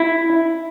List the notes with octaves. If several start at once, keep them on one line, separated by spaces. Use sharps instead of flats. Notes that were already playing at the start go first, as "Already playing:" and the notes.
Already playing: E4